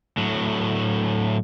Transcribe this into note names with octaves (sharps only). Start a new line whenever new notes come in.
A2 F#3